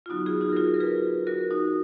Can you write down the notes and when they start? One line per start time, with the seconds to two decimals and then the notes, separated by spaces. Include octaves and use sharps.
0.06 F4
0.10 D3 F#3 B3 D#4 F#4
0.26 F4 G#4
0.41 D#4 F#4
0.52 A#4
0.56 F4 G#4
0.74 A#4
0.80 G#4 B4
1.27 F#4 A#4
1.51 D#4 F#4